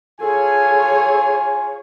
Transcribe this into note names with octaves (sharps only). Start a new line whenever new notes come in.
F4 G#4 A4 C#5 G#5